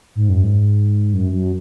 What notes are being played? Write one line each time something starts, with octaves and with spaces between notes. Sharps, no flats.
G#2
F#2
G#2
F#2
F#2